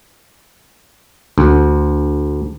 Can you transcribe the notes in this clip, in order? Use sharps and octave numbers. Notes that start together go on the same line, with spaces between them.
D2